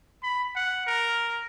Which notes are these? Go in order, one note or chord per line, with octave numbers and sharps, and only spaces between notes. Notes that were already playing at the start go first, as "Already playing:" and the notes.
B5
F#5
A#4